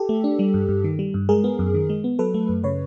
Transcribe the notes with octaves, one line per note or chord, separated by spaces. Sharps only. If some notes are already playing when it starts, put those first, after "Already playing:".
Already playing: G4 A4
A3
D4
G3
G2
G2
D#3
G3
G2
G#3 G#4 A#4
B3
F#2
D#3
G#3
B3
F#3 A4 B4
A3
F#2
C#3 B4 C#5